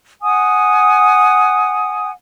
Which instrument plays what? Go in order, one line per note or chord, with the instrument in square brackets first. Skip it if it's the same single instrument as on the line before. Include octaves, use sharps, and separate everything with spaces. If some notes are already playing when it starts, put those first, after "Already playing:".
[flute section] F#5 G#5 D#6